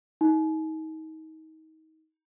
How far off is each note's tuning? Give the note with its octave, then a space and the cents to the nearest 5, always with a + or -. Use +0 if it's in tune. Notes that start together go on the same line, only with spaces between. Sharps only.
D#4 +30